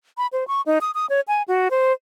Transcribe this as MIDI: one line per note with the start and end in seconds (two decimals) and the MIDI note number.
0.18 0.27 83
0.33 0.46 72
0.48 0.61 85
0.66 0.79 63
0.81 0.91 87
0.95 1.06 87
1.10 1.21 73
1.28 1.42 80
1.48 1.68 66
1.71 1.92 72